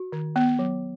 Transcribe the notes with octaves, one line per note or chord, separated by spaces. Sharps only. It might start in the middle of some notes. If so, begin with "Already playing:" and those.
Already playing: F#4
D#3
B3
F#3